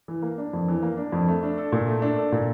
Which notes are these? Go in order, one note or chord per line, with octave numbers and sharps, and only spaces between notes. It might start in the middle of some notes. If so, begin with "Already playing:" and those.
E3
A#3
D4
F2
E3
A#3
D4
F2
A3
D4
A4
A#2
A3
D4
A4
A#2